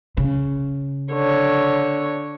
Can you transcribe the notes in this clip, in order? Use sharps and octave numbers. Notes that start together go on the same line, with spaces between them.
C#3
D3 C#5